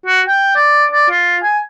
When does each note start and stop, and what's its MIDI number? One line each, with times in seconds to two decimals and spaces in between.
0.06 0.22 66
0.28 0.55 79
0.56 0.86 74
0.92 1.09 74
1.11 1.38 65
1.43 1.59 80